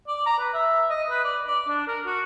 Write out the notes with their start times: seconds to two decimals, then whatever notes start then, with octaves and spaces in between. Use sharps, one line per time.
0.08 D5
0.26 A#5
0.39 B4
0.54 E5
0.90 D#5
1.10 B4
1.25 D5
1.47 D5
1.69 D4
1.88 A#4
2.06 F#4